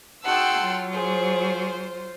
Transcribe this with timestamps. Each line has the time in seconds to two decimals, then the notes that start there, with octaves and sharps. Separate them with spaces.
0.25 D#4 F#4 G#4 F#5 G5 A5 C6 E6
0.60 F#3 F4
0.93 G#4 C5